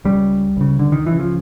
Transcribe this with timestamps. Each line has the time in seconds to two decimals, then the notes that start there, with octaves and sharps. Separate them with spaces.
0.05 C#2 C#3 G3
0.57 C#2 C#3
0.79 D3
0.92 D#3
1.06 C#2 C#3 E3
1.19 F3